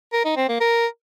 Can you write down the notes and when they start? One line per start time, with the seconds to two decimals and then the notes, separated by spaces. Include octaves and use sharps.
0.13 A#4
0.25 D#4
0.37 C4
0.49 A#3
0.61 A#4